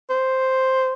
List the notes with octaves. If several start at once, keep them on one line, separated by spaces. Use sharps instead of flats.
C5